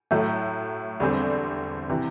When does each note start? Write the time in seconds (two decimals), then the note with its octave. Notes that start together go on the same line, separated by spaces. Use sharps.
0.11 A2 F#3 A3
1.00 E2 D3 G3 C4
1.89 C3 E3